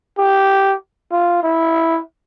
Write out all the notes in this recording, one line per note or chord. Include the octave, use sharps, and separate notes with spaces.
G4
F4
E4